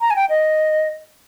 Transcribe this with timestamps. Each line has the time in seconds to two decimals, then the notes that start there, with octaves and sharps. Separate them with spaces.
0.01 A#5
0.10 G#5
0.16 G5
0.30 D#5